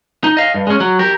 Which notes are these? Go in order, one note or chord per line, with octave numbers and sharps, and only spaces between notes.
D#4
D#5 F5
G2
G#3 C#4
F#3
G4 A#4